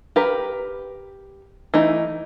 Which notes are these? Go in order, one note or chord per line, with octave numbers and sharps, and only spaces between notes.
G4 A#4 B4
E3 A3 D#4